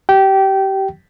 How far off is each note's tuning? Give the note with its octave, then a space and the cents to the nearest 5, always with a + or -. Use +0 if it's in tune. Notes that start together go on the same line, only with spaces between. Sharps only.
G4 -25 G5 -20